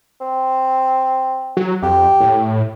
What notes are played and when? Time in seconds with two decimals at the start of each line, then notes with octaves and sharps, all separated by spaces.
0.21 C4
1.57 F#3
1.82 F2 G4
2.20 A2